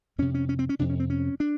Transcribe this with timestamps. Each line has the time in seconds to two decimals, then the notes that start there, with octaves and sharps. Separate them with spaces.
0.18 F2 C3 C#4
0.34 C#4
0.49 C#4
0.59 C4
0.69 C#4
0.79 F2 C3 D4
0.90 C#4
1.00 C4
1.10 C#4
1.40 D4